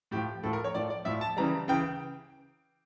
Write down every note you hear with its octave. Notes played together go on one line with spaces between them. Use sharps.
A2 F3 G4
A2 F3 A4
A#4
C#5
A2 F3 D5
D5
A2 F3 E5
A5
C#3 E3 G3 A#5
C#3 E3 G5